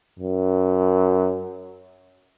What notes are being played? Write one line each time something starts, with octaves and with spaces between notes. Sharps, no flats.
F#2